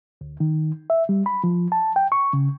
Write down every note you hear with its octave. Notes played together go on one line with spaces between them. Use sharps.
D2
D#3
E5
G3
B5
F3
A5
G5
C#6
C#3